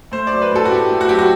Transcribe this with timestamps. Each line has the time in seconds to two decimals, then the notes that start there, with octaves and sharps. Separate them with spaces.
0.12 A3 C5
0.27 F#3 D5
0.42 B4
0.52 A2 A4
0.65 F#4
0.71 A2 G4
0.90 A3
1.01 F#4
1.09 F#3 G4
1.18 F#4